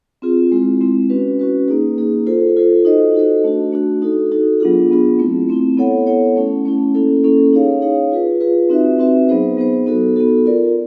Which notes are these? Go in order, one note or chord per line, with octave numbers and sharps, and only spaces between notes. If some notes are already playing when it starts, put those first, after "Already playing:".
C4 F4 G#4
G#3 C4 E4
G#3 C4 E4
C#4 F#4 B4
C#4 F#4 B4
A#3 D#4 G#4
A#3 D#4 G#4
F4 A4 C5
F4 A4 C5
D#4 F#4 A4 C5 D#5
D#4 F#4 A4 C5 D#5
A3 D4 F#4
A3 D4 F#4
D#4 F#4 A4
D#4 F#4 A4
F#3 B3 D4 F4 G#4
F#3 B3 D4 F4 G#4
A3 C4 E4
A3 C4 E4
B3 E4 A4 C#5 F#5
B3 E4 A4 C#5 F#5
A3 C#4 E4
A3 C#4 E4
A#3 C#4 E4 A4
A#3 C#4 E4 A4
D#4 G#4 C#5 F5
D#4 G#4 C#5 F5
F4 G#4 B4
F4 G#4 B4
C4 D#4 F#4 B4 E5
C4 D#4 F#4 B4 E5
F#3 B3 D#4 G#4 C5
F#3 B3 D#4 G#4 C5
B3 D#4 F#4 A4
B3 D#4 F#4 A4
F4 A#4 D5